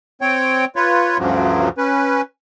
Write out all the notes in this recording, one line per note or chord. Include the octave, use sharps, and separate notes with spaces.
C4 C#5 G5
F4 B4 C#5
D2 G2 C#3 F3 F#3
C#4 B4